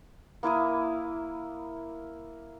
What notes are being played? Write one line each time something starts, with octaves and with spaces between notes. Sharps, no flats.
A#3 E4 D6 D#6